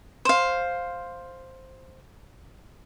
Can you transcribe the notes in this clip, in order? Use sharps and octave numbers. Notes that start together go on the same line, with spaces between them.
C5 F5